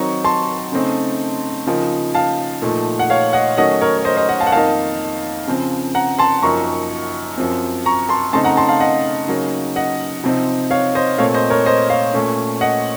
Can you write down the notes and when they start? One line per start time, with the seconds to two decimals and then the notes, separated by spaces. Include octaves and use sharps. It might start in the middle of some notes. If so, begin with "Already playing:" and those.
Already playing: D#3 F#3 C4 D#4 A#5 C#6
0.25 A5 C6
0.72 C#3 A3 C4 D#4
1.67 C#3 F3 A#3 D#4
2.15 F5 A5
2.62 A#2 F3 A3 D#4
2.99 F#5
3.10 C#5 F5
3.33 D#5 F#5
3.57 D#3 F#3 A3 C#4 D#5 F#5
3.81 A#4 C#5
3.98 C#5
4.04 C5 D#5
4.17 C5 D#5
4.29 D#5 F#5
4.40 F5 A5
4.47 F#5
4.52 F2 D#3 A#3 D#4 F5 A5
5.47 C#3 F3 C4
5.95 F#5 A#5
6.19 A5 C6
6.43 F#2 F3 A#3 D#4 A#5 C#6
7.37 F#2 F3 C4
7.86 A#5 C#6
8.09 A5 C6
8.33 C#3 A3 C4 D#4 A5 C6
8.44 F#5 A#5
8.57 A5 C6
8.68 F5 A5
8.80 D#5 F#5
9.28 C#3 F#3 A#3 D#4
9.76 D#5 F#5
10.24 C3 F3 C4 D#4
10.71 C#5 F5
10.95 C5 D#5
11.18 A#2 A3 C4 C#5 F5
11.34 C5 D#5
11.50 A#4 C#5
11.66 C5 D#5
11.90 C#5 F5
12.13 A#2 A3 C#4
12.61 D#5 F#5